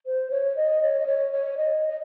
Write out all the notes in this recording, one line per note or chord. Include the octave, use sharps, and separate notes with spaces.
C5
C#5
D#5
C#5
D#5
C#5
C#5
D#5
D#5